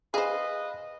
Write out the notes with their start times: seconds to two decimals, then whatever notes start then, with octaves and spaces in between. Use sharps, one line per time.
0.14 G#4 B4 C5 D#5 F5 B5